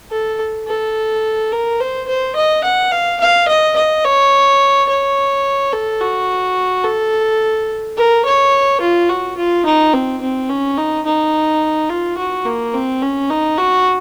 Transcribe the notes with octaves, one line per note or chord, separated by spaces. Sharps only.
A4
A4
A#4
C5
C5
D#5
F#5
F5
F5
D#5
D#5
C#5
C#5
A4
F#4
A4
A#4
C#5
F4
F#4
F4
D#4
C4
C4
C#4
D#4
D#4
F4
F#4
A#3
C4
C#4
D#4
F#4